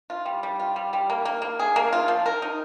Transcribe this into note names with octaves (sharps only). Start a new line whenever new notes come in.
F4
G3
G3
F4
G3
G3
A#3
A#3
A#3
G#4
A#3
F4
F3
A#4
D#4